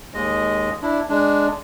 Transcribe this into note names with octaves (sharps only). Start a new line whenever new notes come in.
D#2 G#3 D#5
D4 E4
G#3 D4